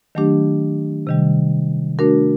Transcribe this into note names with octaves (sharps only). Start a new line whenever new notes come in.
D#3 F#3 A3 D4 G4
C3 D#3 G3
A3 D4 F#4 A#4